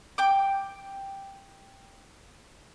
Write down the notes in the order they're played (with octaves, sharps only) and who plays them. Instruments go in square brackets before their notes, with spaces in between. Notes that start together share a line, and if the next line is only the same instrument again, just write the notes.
[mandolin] G5 D6